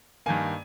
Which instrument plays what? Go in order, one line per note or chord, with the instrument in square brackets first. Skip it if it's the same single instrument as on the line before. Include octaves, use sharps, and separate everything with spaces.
[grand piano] G2 D#3 A#3 G#5